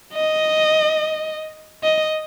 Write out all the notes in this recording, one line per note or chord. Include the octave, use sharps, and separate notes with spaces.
D#5
D#5